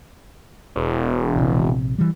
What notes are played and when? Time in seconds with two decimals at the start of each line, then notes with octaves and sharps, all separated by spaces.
0.76 E1
1.35 A#1 C3
1.98 E3 G3